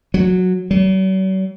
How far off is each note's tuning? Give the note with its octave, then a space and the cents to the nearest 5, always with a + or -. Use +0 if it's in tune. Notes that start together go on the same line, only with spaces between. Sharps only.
F#3 -10
F#3 +45